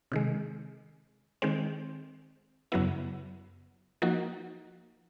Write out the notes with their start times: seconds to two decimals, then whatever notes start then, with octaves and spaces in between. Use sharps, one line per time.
0.12 C3 D#3 G#3
1.42 D#3 G#3 C4
2.72 F#2 C#3 F#3 B3 E4
4.02 F3 A#3 D#4 F#4